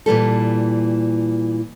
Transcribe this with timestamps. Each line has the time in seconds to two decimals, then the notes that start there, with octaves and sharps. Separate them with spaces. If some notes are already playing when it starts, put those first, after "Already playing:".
0.06 A#2 E3 G3 A4